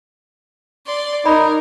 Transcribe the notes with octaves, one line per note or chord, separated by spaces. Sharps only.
D5 C6
D#4 A#4 D5 B5